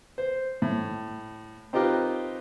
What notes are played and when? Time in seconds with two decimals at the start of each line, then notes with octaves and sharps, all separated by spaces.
0.18 C5
0.62 A2
1.73 C4 D#4 F4 G4 A#4 B4